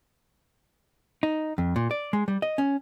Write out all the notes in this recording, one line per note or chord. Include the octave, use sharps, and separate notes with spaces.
D#4
F2
A#2
D5
G#3
G3
D#5
C#4